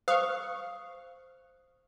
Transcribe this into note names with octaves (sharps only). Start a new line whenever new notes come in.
C5 F5 C#6 D#6